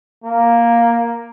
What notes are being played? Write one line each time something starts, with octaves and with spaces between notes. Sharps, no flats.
A#3